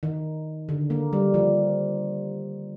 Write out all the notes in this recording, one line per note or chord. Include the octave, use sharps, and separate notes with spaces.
D#3
D3
A#3
G3
F3